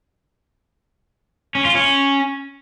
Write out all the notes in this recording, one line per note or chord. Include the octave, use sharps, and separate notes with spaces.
C#4
F4
C#4